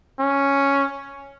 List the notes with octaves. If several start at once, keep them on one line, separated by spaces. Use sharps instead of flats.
C#4